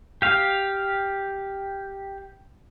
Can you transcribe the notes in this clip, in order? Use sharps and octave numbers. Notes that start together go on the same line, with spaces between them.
G4 F5